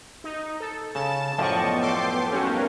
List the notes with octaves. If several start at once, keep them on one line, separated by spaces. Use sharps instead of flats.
D#4
A4
C#3 A5 E7
F#2 A2 F3 B3 D5 D#5 G5 C#6
A4 C6 D6
G3 A3 C#4 D#4 F#4 A#4 F5